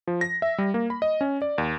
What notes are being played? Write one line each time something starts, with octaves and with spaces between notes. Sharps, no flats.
F3
A#6
E5
G3
A#3
B5
D#5
C#4
D5
D#2